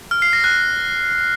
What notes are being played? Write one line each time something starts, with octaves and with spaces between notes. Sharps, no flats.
F6
C7
A#6
F#6